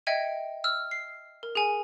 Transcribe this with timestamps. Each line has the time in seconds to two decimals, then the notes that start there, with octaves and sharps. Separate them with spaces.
0.07 D#5 E5 G5 G#6 C#7 D#7
0.64 E6 F6
0.91 C7
1.43 A#4
1.55 G#4 G#5